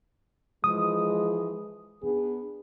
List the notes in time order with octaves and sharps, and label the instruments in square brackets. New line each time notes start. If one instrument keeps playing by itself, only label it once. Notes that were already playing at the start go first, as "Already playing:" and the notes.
[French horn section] E3 F3 G#3 [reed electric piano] D#6
[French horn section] B3 D4 G#4